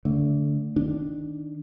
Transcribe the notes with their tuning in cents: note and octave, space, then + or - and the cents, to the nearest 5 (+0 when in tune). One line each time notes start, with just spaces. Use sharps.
D3 -25 A3 +0
D#3 +0 D4 +0